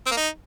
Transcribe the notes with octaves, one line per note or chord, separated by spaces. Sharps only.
C4
A#3
D#4